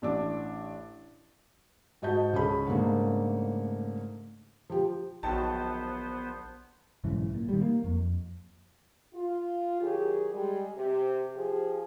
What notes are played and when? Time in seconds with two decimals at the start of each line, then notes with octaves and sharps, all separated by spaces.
0.02 A1 D4 D6
2.02 G#2 F#4 D#5 A5 G6
2.33 C#2 C#4 G#4 A4 C#5 B5
2.67 G#2 C#3 A3 A#3 D4
4.70 F3 G4
5.23 A#1 D#3 F#3 B3 C5 A5
7.04 B1 G#2 C#3 E3
7.34 A#2
7.49 D#3 G3
7.61 A#3
7.84 F2
9.13 F4
9.81 D#3 F#3 G4 G#4
10.32 G3 G#3 G#4
10.76 C3 G4
11.34 F3 G4 G#4